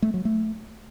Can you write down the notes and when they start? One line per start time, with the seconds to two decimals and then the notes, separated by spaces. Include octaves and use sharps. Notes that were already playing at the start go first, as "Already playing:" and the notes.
0.02 A3
0.14 F#3
0.25 A3